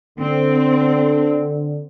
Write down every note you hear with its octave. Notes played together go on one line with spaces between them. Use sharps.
D3 C4